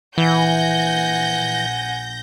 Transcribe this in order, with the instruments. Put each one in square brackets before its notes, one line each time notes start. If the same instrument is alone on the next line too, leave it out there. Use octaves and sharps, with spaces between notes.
[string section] A#1 G6 A#6 [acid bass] E3 [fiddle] F#5 G#5